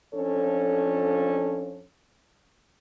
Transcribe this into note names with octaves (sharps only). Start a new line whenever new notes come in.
F2 F3 C#4 D4 A4 C#5